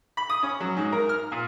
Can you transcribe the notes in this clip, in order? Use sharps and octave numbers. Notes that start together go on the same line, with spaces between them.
B5
D#6
C#4
F#3
G#2
A#4
F6
A#2